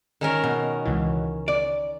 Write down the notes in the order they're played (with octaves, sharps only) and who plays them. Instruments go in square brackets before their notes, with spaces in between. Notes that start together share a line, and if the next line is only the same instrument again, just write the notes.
[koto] D#3 C#4 A#4
[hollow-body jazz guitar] B2
[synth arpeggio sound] C#2 E3
[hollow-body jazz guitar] D5